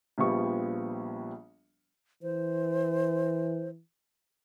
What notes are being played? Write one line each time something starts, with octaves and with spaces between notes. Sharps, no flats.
A#1 F3 G3 B3 C#6
E3 C5